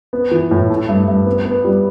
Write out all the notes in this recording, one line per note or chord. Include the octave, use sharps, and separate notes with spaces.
B3
E3
A2
A3
G2
G2
B3
B3
G3